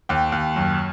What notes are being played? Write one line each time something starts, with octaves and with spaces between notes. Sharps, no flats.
D#2 G5
D#2
F#2